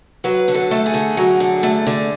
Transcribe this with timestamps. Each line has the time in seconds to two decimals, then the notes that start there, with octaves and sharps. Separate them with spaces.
0.24 F#3 B4
0.48 D3
0.55 A4
0.71 A3
0.86 G#4
0.94 D3
1.17 F#3
1.40 D3
1.63 A3
1.87 D3